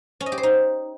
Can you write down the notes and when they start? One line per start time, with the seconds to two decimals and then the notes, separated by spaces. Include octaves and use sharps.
0.20 C#4
0.26 D#5
0.32 G4
0.38 C5
0.43 D#4